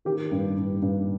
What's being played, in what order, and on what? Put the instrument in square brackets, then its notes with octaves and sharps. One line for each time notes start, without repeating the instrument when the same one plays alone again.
[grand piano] D#3 G4
G2
G2
G2